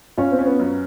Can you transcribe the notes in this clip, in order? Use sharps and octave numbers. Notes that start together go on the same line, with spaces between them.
C#4 F4
C4
C#4
B3
F#2